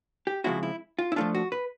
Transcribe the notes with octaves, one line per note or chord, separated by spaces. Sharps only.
G4
C#3 F3 G#3 C4 E4 F#4
E4
F4
E4
F3 A3 D4 F4
F#4
B4